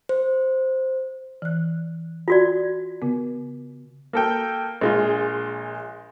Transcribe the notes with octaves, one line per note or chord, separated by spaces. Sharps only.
C5
E3 F#6
F4 F#4 D5
C#3 B3
A#3 A4 G5
A#1 G#3 F4